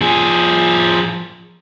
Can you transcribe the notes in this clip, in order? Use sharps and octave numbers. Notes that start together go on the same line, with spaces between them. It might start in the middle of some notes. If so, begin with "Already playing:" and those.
F3 G#4